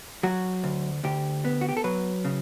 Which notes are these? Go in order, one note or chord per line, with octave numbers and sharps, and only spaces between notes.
F#3 F#4
D2
D2 G4
B3
F#4
G4
A4
F#3 B4
C#3